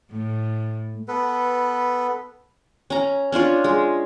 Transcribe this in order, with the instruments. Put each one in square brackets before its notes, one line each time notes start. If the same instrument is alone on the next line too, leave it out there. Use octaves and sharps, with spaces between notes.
[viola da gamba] A2
[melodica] B3 A4 B4
[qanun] C#4 A#5
C#4 D4 F4 C#5
G#3